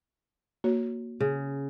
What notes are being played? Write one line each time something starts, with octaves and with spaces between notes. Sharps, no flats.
A#3 F#4 C#5
C#3